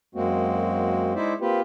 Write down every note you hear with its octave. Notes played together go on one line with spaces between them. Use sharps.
F#2 G#3 A#3 C4 F#4
G#3 D#4 E4 C5 D5 E5
A#3 C4 F4 G4 B4